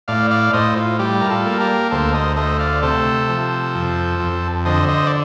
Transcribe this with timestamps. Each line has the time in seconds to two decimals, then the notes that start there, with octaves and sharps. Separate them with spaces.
0.08 A2 D5 F5
0.31 D5 F5
0.54 A2 C5 D#5
0.76 F4
0.99 G3 G4
1.21 A#4
1.30 F4 A4
1.46 A#3
1.60 G4 A#4
1.91 D2 A4 C5
2.14 C5 D#5
2.37 A3 C5 D#5
2.59 D5 F5
2.82 C3 A4 C5
3.29 F3
3.75 F2
4.19 F2
4.65 D3 C5 D#5
4.88 C5 D#5
5.07 D5